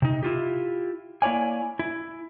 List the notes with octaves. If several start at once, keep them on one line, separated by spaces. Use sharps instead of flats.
C3 D#4
E4 F4 G4
A#3 E4 C#5 D5 G#5
E4